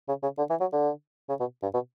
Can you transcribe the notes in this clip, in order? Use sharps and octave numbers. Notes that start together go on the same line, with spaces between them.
C#3
C#3
D3
E3
F#3
D3
C#3
B2
G2
B2